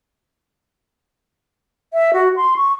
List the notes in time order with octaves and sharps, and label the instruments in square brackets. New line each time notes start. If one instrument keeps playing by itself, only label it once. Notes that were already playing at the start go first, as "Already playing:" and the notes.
[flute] E5
F#4
C6
C#6